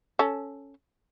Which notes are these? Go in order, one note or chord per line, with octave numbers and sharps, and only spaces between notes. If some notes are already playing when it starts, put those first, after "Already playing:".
C#4 A4